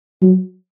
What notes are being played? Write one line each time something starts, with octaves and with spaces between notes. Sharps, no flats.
F#3